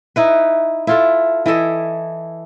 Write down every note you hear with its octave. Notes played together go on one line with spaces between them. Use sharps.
D#4 E4 B4
E4 F4 A4
E3 E4 A4 D#5